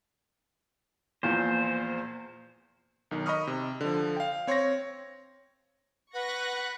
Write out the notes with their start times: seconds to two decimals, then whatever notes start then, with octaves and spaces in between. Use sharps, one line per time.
1.23 E2 A#2 F3 C5
3.11 B1 D#3
3.26 D#5 B5 C#6 D#6 F6
3.47 C3
3.81 D3 F3
4.17 F5 G5
4.47 C4 C#5 C6 C#6 G#6 A#6
6.14 B4 F#5 C#6 F#6 A#6